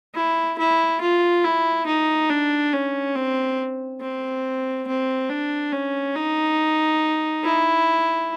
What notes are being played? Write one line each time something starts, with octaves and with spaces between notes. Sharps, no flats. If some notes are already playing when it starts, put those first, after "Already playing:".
E4
E4
F4
E4
D#4
D4
C#4
C4
C4
C4
D4
C#4
D#4
E4